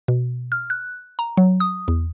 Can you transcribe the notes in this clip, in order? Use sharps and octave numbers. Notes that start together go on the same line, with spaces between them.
B2
F6
F#6
A#5
F#3
D#6
E2